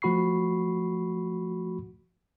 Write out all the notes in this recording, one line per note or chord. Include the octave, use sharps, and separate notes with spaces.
F3 A3 F#4 B5 C#6 C7